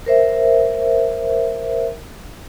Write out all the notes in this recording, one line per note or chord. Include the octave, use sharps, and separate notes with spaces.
A#4 C5 E5